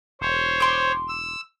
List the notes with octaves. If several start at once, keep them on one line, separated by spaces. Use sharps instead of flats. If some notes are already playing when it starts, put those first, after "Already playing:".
E1 C5 C#5
C6 D6
E6